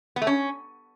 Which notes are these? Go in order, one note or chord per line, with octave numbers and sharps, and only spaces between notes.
B3
A3
C#4